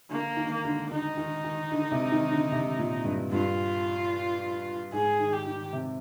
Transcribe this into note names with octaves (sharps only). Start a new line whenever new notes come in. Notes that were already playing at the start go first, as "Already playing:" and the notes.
D3 A#3
D#3
A#3
D3
D3 D#4
D#3
D#3
D3
C3
D#3
D3
C3
A#2
G2
G2 F4
G#2 G#4
D#3
G4
D#3
C3